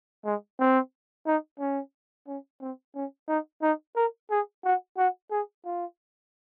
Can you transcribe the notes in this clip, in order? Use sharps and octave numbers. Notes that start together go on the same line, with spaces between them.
G#3
C4
D#4
C#4
C#4
C4
C#4
D#4
D#4
A#4
G#4
F#4
F#4
G#4
F4